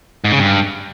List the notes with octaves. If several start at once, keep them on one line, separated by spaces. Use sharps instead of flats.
G#2
C#3
G2